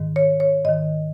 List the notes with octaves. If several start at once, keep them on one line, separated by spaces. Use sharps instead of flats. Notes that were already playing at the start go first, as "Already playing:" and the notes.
Already playing: G#2 D#3
C#5
C#5
G#2 D#3 D#5